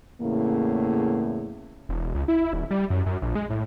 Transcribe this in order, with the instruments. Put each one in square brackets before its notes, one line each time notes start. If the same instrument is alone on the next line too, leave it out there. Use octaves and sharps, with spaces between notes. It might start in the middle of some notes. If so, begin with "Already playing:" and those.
[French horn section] E2 A2 C#3 A#3
[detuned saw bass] E1
C#2
E4
D#1
G3
F#2
F#2
A#1
G#3
A2